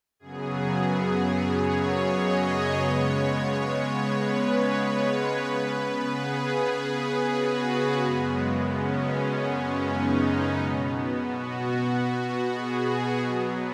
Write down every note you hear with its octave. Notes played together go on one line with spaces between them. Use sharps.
F#2 C#3 F#3 B3 G#4
C#5
D#5
C#3 G#3 B3 C#5
B4
C#3 B3 B4
G#4
F#4
F#2 C#3 G#3 B3
C#4
D#4
B2 B3
F#4
G#4
B2 F#3 B3